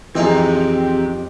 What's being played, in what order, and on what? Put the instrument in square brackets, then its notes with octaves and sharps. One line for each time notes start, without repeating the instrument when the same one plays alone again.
[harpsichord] F2 D#4 G5 [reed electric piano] E3 G#4 [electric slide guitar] C4 A#5 [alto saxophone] G4